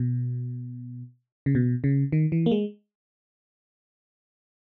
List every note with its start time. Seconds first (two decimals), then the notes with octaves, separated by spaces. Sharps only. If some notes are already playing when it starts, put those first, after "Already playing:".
Already playing: B2
1.46 C#3
1.55 B2
1.84 C#3
2.12 D#3
2.32 E3
2.46 A#3
2.51 G#3